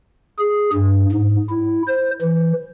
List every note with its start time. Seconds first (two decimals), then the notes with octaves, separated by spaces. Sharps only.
0.39 G#4
0.73 G2
1.12 G#2
1.49 E4
1.88 C5
2.22 E3